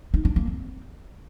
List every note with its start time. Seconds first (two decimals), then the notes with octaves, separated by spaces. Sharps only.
0.14 D#4
0.25 D4
0.36 A#3
0.47 C4